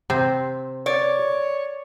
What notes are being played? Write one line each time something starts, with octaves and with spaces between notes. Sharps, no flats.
C3 C4
C#5 D5